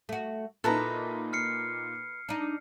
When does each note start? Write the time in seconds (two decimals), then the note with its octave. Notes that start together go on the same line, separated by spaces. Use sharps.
0.09 A3 F#4
0.64 A#2 A#3 D#4 E4 A4 B4 A#5
1.33 F6 C7 C#7
2.29 D4 D#4